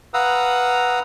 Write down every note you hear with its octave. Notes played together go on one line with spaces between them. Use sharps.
B4 F5 F#5 A#5 D#6 E6